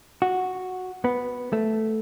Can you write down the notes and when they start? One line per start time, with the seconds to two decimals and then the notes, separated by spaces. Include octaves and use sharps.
0.22 F#4
1.04 B3
1.53 A3